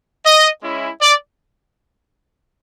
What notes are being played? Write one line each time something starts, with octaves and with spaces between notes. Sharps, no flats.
D#5
G#3 C#4 E4
D5